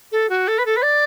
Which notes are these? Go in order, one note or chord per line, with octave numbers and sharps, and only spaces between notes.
A4
F#4
A4
B4
A4
B4
D5